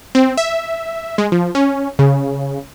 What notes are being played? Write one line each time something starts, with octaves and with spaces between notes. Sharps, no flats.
C4
E5
G#3
F3
C#4
C#3